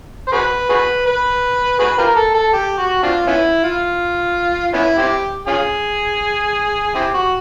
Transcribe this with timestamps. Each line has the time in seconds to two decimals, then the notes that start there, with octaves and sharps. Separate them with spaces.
0.27 C5
0.32 F#4 G#4 B4
0.69 F#4 G#4 B4
1.06 B4
1.79 F#4 G#4 B4
1.98 F4 G4 A#4
2.16 A4
2.34 A4
2.54 G4
2.78 F#4
3.03 C4 D4 F4
3.27 B3 C#4 E4
3.64 F4
4.73 B3 C#4 E4
4.98 C4 E4 G4
5.47 C#4 F4 G#4
6.95 C4 E4 G4
7.14 F#4